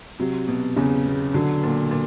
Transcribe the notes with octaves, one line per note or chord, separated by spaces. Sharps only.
C3 F#3
B2
E2 C#3
B2
D3 F#3
A#2
A#2